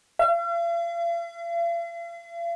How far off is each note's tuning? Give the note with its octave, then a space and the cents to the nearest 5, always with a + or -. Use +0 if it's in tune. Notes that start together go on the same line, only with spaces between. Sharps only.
F5 -45